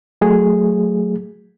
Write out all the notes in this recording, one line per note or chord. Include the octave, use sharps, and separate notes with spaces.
F#3 A3 G#4